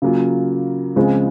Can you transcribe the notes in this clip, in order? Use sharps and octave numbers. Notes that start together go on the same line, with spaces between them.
C#3 F#3 A#3 F4
C#2 C#3 F3 G#3 C4